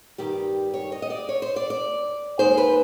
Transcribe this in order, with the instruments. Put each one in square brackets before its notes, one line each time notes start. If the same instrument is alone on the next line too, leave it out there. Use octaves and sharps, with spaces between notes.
[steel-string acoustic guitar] G2 D#3 G3 G4
C#5
D#5
D#5
D5
C#5
C5
D5
D5
D#2 D#3 G#3 C5
B4